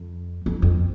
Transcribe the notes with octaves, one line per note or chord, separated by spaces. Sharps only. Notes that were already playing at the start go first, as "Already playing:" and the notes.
Already playing: F2
F2
F2